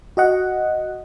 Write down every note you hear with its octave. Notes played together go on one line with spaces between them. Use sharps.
F#4 D#5 F#5